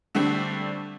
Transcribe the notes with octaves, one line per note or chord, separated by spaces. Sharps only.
D3 G3 A3 C4 D4